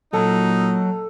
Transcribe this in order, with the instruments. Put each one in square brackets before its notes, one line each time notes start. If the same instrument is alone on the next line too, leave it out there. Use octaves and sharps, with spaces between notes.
[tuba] A#2 [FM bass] F#3 [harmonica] D#4 [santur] A4